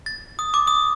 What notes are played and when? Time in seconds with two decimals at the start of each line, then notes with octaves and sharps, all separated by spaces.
0.06 A6
0.39 D#6
0.54 D6
0.67 D#6